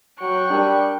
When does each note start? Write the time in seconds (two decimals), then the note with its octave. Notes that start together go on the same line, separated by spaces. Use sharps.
0.21 F#3 G5 C#6 F#6
0.50 G3 D4 G4 A#4